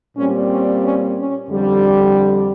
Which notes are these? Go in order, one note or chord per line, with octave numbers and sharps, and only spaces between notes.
A#2 G3 C4 C#4
C#4
C#4
C#4
F2 D3 G3
D4